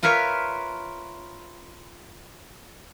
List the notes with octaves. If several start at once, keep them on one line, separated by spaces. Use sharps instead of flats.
F4 A#4 B4 C#5 E5